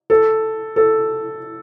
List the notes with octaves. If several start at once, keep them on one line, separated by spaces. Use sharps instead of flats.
A4
A4